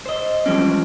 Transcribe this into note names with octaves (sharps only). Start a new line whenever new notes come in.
C5 D#5
E3 F3 G3 G#3 C4 C#4